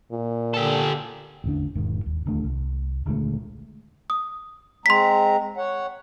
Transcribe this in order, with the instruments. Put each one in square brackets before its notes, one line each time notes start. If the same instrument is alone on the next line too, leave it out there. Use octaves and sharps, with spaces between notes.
[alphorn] A#2
[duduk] D3 [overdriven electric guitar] G4 A4
[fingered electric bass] A1 E2 D3 D4
E1 G#2 D#3
D#2
D1 D#2 D3 A3
C2
D#1 D3 G#3 A3
[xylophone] D#6
[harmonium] G#3 C4 A#5 [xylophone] C6 B6
[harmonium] C#5 F#5